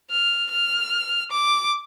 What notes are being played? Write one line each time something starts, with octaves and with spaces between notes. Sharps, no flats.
F6
F6
D6